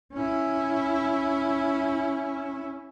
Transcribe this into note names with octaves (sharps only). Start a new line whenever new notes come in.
C#4 E4